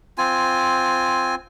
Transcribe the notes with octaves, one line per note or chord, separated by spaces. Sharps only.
C4 F4 G#5